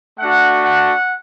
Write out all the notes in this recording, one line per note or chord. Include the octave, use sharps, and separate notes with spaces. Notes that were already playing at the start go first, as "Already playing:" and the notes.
A3 D4 F#4 F#5
F#5